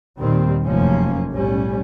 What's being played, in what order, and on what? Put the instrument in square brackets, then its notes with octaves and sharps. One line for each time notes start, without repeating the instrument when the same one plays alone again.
[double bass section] D#2 A#2 D#3 G3 C4
F1 F#2 C3 F3 A#3 C#4
B1 A2 G3 C#4